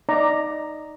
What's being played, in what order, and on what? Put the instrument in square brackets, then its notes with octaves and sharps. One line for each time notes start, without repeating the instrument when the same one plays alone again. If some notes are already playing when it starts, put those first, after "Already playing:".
[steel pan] D#4 D5 A#5